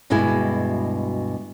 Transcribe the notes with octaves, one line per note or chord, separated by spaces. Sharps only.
D2 G2 B2 G#3 E4 G#5